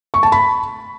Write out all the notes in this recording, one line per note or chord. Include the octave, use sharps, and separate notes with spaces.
C#6
A5
B5